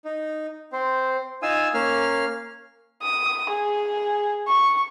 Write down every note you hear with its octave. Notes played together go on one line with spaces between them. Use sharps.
D#4
C4 C5
D#4 F4 F5 G#5 D#6 E6
A#3 C#4 F5 F6
D#6
G#4
C#6